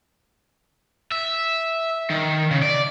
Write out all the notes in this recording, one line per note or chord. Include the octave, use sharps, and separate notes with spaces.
E5
D#3
C#3
D5